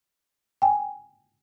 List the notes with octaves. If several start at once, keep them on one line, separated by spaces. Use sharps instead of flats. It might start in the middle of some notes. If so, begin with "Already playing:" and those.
G5 G#5